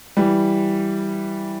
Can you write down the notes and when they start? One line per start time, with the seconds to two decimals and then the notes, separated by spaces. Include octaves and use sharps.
0.17 E3 G3